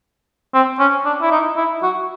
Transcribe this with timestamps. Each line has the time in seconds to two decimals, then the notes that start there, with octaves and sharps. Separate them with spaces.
0.54 C4
0.79 C#4
1.05 D4
1.22 E4
1.31 D#4
1.57 E4
1.83 F#4